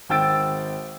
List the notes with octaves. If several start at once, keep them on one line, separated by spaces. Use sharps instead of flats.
G#1 G5 E6 A6 D7